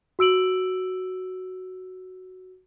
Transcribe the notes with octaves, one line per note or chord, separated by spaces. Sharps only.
F#4 E6 D7 F#7